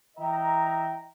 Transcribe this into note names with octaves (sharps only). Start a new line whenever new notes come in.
E3 D#5 E5 G5 A#5